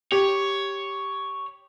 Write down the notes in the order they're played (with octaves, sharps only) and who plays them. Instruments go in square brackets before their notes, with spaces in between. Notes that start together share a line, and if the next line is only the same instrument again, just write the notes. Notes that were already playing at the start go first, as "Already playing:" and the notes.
[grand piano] G4 [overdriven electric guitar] C#5